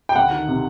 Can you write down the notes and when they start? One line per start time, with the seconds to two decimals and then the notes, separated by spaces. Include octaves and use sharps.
0.09 G5
0.15 D2 F#5
0.31 D#3
0.48 C3